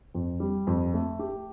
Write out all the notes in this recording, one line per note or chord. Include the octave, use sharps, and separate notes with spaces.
F2
G3
F2
A3
G4